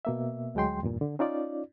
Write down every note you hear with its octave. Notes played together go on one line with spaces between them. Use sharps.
B2 A#3 E5
D2 F#3 G#3 G5 C6
E2 G2 A#2
D3
C#4 D#4 F4 D5